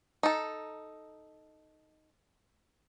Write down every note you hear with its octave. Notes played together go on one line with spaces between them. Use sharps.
D#4 A4